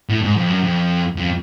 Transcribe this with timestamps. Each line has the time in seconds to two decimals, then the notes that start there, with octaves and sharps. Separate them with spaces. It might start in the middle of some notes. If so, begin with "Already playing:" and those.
0.09 A2
0.24 G#2
0.37 F2
0.49 F#2
0.63 F2
1.17 F2